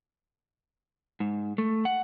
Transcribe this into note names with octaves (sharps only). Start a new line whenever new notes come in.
G#2
A3
F#5